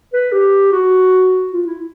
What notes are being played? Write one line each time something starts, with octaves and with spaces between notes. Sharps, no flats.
B4
G4
F#4
F4
E4